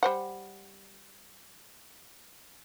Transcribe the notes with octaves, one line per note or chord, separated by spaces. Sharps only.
G3 C5 F#5